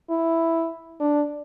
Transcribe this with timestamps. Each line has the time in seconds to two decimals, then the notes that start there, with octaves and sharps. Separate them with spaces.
0.10 E4
1.00 D4